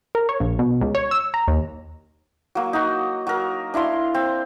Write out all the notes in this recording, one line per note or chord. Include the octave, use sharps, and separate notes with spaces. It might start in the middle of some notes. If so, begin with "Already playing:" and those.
A#4
C#5
A#1
B2
C#2
C#5
E6
A#5
D#2
F#3 A#3
D#4 F#4
F#3 A#4
D4 E4 F5 C6
C4